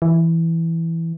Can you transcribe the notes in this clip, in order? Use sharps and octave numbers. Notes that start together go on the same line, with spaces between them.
E3